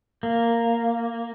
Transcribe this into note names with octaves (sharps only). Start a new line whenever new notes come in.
A#3